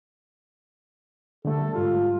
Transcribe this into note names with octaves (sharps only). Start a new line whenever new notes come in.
D3 G3 A3 A4
G#2 G3 F4